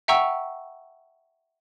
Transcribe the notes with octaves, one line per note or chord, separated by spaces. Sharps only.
E5 F#5 G5 A#5 C#6 E6